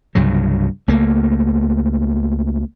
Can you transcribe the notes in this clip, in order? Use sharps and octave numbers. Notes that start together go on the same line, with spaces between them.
C2 G2 C#3 F#3
C#2 A3 A#3